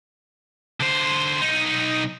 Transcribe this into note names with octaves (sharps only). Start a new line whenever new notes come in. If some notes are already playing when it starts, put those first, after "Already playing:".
D3 C5
B1 D#4